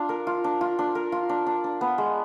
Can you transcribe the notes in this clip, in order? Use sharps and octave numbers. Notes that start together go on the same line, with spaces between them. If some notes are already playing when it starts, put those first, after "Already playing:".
Already playing: D4 F4
A#4
F4
D4
F4
D4
A#4
F4
D4
D4
D4
B3
G#3